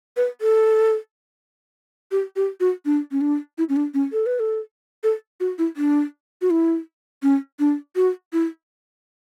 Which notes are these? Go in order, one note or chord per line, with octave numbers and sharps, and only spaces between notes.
B4
A4
G4
G4
F#4
D4
C#4
D4
E4
C#4
D4
C#4
A4
B4
A4
A4
F#4
E4
D4
F#4
E4
C#4
D4
F#4
E4